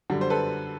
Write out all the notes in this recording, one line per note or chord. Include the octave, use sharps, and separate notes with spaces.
F#2 D3 G3
C5
A4 B4